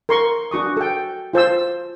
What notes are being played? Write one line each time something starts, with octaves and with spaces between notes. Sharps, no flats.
A#4 C6 C#6
D4 F#4 C#6 D#6
A4 G5
F4 C5 A5 E6